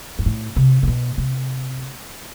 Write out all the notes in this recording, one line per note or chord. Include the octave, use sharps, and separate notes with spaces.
G2
A2
C3
C3
B2
C3